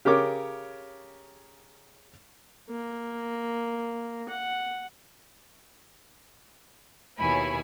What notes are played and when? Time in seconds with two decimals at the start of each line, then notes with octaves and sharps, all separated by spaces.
0.05 C#3 G4 A#4 C#5 D6
2.70 A#3
4.28 F#5
7.18 D#2 B2 E4 C#5 G#5 B5